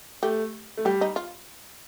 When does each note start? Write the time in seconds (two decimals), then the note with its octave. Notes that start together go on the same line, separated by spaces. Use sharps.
0.23 A3 G4
0.77 A3
0.85 G3 G4
1.01 D#4
1.16 F4